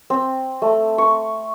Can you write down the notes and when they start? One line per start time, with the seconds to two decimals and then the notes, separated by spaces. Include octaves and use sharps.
0.10 C4
0.62 A3
0.98 C#6